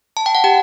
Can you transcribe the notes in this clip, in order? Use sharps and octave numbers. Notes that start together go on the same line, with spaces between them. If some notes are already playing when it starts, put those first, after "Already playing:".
A5
G5
F#5
G4 G5